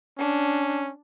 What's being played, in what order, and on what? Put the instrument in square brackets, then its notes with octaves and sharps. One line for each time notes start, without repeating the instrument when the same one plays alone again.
[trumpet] C#4 [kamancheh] D4